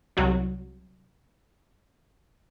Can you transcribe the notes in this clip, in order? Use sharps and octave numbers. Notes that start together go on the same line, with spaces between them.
C2 F#3 G3